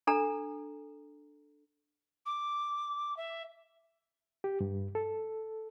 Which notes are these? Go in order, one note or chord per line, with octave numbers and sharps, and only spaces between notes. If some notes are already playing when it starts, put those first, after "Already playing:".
D4 A4 A#5
D6
E5
G4
G2
A4